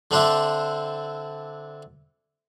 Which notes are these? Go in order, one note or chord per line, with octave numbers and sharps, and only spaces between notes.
D3 C4 D4 E4